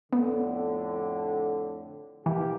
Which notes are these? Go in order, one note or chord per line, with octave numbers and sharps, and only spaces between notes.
F2 A2 D3 B3
B2 E3 A#3 G4